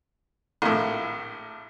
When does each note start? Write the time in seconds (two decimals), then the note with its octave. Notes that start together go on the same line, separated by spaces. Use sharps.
0.62 A#1 A2